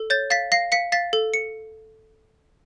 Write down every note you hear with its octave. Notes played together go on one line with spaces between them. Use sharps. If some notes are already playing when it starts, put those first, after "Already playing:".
Already playing: A4
C#5 G6 A6
F5 A6 B6
F5 A#6 C7
F5 B6 C#7
F5 A6 B6
A4
C#7